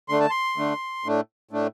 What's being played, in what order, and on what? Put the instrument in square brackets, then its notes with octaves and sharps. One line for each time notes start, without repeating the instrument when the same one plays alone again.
[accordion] D3 A3 D4 C6
A5
C6
D3 A3 D4
A2 A3 D4
A2 A3 D4